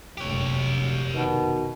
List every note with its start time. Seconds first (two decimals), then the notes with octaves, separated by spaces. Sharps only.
0.17 F1 A#1 F#2 G4 C#5
1.14 B2 D#3